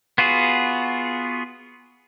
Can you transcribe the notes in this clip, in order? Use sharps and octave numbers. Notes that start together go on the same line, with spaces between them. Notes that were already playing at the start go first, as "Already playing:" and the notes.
B3 F4 F#4 G#4